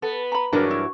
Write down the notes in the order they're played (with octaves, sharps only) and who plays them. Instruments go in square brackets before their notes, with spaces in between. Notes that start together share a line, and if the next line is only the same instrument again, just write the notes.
[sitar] B3 [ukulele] A4
[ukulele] A#5 B5
[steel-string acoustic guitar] G2 E3 F#3 [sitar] C#3 [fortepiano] D4 A#4
[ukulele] E4